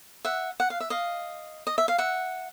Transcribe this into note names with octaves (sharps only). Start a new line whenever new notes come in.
E5 F#5
F#5
F5
E5
D#5 F5
D#5
E5
F5
E5 F#5